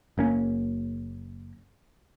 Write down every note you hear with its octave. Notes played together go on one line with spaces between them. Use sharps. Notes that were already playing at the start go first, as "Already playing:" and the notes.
F#1 A#3 C#4